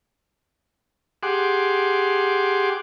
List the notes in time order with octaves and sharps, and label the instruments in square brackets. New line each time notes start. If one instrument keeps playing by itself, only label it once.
[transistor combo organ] G4 G#4 F#5 C6 D6